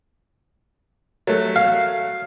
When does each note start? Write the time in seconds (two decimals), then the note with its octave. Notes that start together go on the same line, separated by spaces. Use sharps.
1.27 F#3 A3
1.56 F5